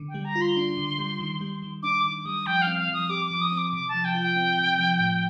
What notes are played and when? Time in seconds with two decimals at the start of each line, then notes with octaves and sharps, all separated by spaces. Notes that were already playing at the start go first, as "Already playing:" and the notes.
Already playing: D3
0.09 G5
0.14 G3
0.25 A#5
0.36 F4
0.41 C6
0.57 D4
0.77 D3
0.98 G3
1.20 D#3
1.41 G3
1.62 D#3
1.83 D4 D6
2.04 D#3 D6
2.25 G3 D#6
2.46 F3 G5
2.62 F5
2.67 C4
2.78 F5
2.89 F3 D#6
3.10 G4 D6
3.25 D6
3.31 F3
3.41 D#6
3.52 C4
3.57 D6
3.73 C3 D6
3.89 A5
3.94 F3
4.05 G5
4.15 F4
4.20 G5
4.36 C4
4.57 C3
4.79 F3
4.99 A2